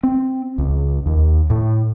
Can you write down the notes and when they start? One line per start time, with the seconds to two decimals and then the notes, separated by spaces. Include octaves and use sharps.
0.03 C4
0.58 C#2
1.06 D#2
1.50 A2